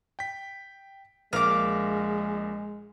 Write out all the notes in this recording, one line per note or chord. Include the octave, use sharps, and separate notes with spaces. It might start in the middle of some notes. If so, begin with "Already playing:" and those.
G5 B6
A#1 G#3 A#4 F5 D6 F6